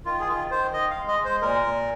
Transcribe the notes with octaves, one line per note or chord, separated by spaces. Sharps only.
D#3 F4
G#4
D#3 F4
D#3 C5
D#3 D#5
F5
G#3
D#5
G#3
C5
A#2 A#4
A#2